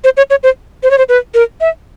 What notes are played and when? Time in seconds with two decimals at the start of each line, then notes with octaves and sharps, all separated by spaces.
0.04 C5
0.17 C#5
0.30 C#5
0.43 C5
0.83 C5
0.91 C#5
0.98 C5
1.09 B4
1.34 A#4
1.61 E5